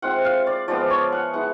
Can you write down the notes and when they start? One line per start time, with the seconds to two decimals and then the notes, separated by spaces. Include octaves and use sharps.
0.02 G#3 C4 F4 F#5
0.25 F5
0.47 D5
0.68 F3 G#3 B3 D5
0.90 C#5
1.12 F#5
1.34 G#3 B3 E4 F#5